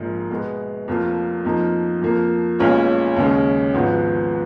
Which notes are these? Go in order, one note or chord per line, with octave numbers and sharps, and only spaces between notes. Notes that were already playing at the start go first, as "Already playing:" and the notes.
Already playing: A#1 G#2 F3 A#3
B2 G#3 B3
F1 F2 F3 A#3 F4
F2 F3 A#3 D#4 A#4
F2 F3 A#3
B1 A#2 G#3 C#4 F4
D#2 C#3 G#3 C#4
G#1 G#2 F3 B3 F#4